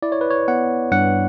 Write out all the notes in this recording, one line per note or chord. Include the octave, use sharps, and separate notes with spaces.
E4 D5
C#5
B4
C#5
B3 F#5
G2 F#5